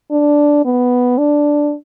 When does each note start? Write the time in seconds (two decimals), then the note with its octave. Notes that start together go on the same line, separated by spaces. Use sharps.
0.11 D4
0.65 B3
1.18 D4